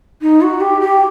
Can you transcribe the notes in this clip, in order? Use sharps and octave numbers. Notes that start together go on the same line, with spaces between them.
D#4
F#4
G4
G4